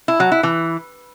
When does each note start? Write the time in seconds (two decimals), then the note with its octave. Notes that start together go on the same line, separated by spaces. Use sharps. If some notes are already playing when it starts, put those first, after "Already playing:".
0.08 E4
0.20 F#3
0.32 E4
0.43 E3